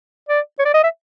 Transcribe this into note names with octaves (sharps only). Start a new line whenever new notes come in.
D5
C#5
D5
D#5
E5